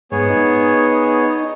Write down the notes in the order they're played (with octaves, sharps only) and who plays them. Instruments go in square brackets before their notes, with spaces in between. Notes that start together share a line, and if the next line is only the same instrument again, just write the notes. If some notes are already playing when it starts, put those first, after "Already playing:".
[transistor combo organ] G#2 [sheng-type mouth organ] B3 G#4 C#5
[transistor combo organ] D#4